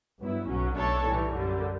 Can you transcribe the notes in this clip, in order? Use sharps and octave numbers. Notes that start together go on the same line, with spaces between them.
G2 F#3 B3 E4
B1 A2 F#3 C#4
B1 B2 A3 D4 A4 C#5
A2 E3 G3
F#2 D3 G3